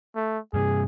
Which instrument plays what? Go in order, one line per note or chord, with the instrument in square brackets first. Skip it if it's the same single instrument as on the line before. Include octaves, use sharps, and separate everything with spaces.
[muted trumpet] A3
[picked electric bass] G2 C3 [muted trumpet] G#4